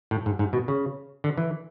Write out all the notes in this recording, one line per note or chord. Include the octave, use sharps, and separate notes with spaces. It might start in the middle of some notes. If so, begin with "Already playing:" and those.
A2
G#2
G#2
B2
C#3
D3
E3